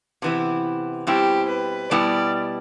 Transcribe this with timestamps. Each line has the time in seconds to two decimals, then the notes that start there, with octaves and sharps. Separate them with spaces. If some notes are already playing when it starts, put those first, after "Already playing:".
0.22 C3 E3 B3 E4
1.07 B2 G3 C4 E4 G4
1.49 B4
1.90 B2 G3 B3 E4 D5